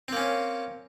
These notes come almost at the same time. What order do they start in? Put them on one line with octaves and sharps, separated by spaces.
C4 A#3 C#4